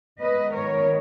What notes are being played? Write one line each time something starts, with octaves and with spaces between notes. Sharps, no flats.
D#3 G#3 B3 B4 D#5
A#4 C#5